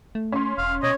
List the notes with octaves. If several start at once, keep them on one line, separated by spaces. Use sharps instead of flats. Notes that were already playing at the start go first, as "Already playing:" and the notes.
A3
C#4 C6
E1 F5
B2 C#5 D#5